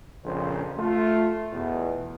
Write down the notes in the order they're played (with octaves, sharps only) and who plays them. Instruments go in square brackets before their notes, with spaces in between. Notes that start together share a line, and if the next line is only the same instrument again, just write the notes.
[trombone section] A#1 F2 C#3 C5
A3 F4
E2 B2